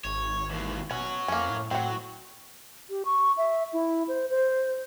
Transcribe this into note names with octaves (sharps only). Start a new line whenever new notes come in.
G#1 C#5
D#2 E3
B2 C#4 C#5 F#5
F2 A#3 C#4
A2
A2 F#3 C4 F#5
G4
C#6
E5
E4
C5
C5